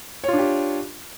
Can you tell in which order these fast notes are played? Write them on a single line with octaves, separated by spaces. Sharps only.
C#5 F4 D4 G4